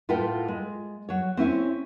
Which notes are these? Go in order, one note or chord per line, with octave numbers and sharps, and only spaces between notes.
A2 F4 A#4 B4 F#5 G5
G#3
F#3 C#5
C4 C#4 E4 C#5